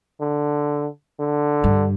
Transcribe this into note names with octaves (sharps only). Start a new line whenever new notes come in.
D3
D3
G2